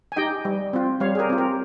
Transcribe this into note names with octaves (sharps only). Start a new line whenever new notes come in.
G#5
D#4 G4 D#5 G5
G3
C4 F4
G3 C#5 F5
G#4
G4 A#4
C4 F4
G4 A#4